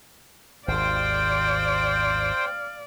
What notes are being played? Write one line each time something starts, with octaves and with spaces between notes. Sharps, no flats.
G#1 D#2 C5 D5 F5 G5